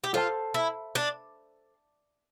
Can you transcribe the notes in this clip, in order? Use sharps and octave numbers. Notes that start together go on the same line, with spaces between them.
G4
F4 A4 C5 F5 A5
E4
D4